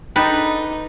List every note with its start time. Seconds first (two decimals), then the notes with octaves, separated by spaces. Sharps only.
0.16 D4 D#4 A4 B4 G5